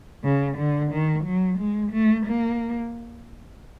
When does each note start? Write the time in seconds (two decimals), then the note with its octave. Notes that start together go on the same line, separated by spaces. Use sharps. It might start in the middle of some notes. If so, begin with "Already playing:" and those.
0.24 C#3
0.58 D3
0.92 D#3
1.25 F#3
1.59 G#3
1.93 A3
2.26 A#3